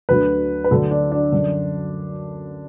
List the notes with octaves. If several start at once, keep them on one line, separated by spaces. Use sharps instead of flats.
D2 D3 F#3 B4
B4
D2 D3 F#3 A4
D4
D4
F#2 D3 F#3